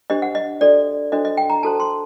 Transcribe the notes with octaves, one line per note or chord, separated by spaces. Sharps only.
D4 G4 C5 D#5
F#5
D#5
D4 F#4 A4 C5 D5
D4 F#4 A4 C5 D#5
D#5
G5
A#5
D4 F#4 A4 C5 A5
C6